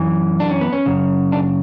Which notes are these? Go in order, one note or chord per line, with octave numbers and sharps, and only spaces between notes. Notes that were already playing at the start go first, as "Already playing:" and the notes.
Already playing: F#2 E3
D4
C#4
B3
C#4
F#2 C#3
D4